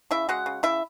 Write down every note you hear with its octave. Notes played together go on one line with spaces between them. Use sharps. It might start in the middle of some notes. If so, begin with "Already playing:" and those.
C#3 E4 E5
G#3 F#4 F#5
C#3
C#3 E4 E5